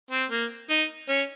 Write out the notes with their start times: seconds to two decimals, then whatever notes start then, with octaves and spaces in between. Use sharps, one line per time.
0.11 C4
0.31 A#3
0.70 D#4
1.09 C#4